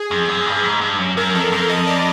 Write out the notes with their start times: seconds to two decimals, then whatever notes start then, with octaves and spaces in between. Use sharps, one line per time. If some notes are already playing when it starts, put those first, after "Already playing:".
Already playing: G#4
0.11 F2
0.29 F#2
0.46 G2
0.64 G#2
0.81 G2
0.98 F#2
1.17 F#2 A#4
1.34 F2 A4
1.52 F2 A#4
1.70 D#5
1.87 D5